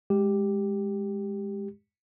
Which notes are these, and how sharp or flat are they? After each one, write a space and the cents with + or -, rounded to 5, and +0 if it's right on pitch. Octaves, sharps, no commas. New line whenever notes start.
G#3 -5 G4 +5